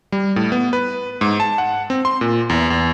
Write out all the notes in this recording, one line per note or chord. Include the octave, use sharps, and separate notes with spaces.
G3
A2
B3
B4
G#2
A5
F#5
C4
C6
A#2
E2
E2